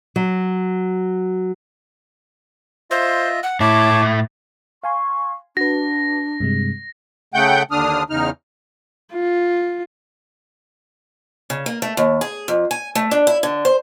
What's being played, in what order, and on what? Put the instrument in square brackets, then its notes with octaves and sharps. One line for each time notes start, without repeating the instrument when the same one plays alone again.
[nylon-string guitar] F#3
[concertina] F4 D#5 E5 [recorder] C5
[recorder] F#5
[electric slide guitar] A2 E4 [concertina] C#5 A5 [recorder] D6
[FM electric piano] F5 G#5 C6 [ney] C#6
[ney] D4 [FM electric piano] F#4 B4 [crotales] A#6
[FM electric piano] G2 C3 G#3
[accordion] C#3 A3 F#5 G5 G6
D#2 D3 D4 D#6 F6
E2 C#3 D#4 F6
[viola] F4
[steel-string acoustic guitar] C#3
A#3
A3
D#2
G#4
F2
G#5
A3
D4
E4
D3
C5